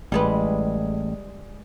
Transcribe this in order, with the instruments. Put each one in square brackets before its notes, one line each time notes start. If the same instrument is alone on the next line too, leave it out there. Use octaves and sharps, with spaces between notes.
[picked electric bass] A1 [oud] G3 G#3 B4